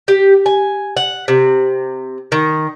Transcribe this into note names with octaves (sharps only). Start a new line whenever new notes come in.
G4
G#5
F#5
C3
D#3